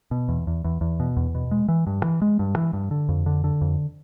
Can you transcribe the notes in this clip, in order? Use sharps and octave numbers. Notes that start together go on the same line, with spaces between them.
B2
E2
E2
E2
E2
B2
E2
B2
G#3
E3
G2
E3
G#3
G2
E3
G2
D3
F2
D3
D3
F2